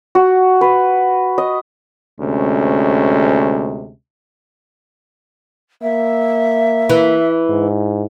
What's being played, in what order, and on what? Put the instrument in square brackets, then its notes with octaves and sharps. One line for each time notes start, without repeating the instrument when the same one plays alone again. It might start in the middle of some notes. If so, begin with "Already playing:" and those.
[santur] F#4
B4
D#5
[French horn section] D2 C3 G#3 C#4
[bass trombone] A#3 [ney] E5
[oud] E3
[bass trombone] G#2